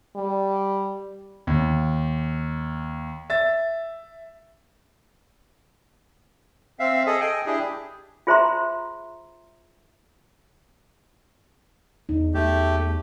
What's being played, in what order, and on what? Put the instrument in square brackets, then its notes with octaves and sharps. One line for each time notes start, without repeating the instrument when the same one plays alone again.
[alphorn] G3
[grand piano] D#2
E5 A6
[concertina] C4 E5 F5
G#4 A4 D#5
D#5 G5 G#5
D4 E4 G4 G#4
[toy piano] F4 G#4 C5 E5 A#5 C6
[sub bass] E2 [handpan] D#4
[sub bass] E2 [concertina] A3 G4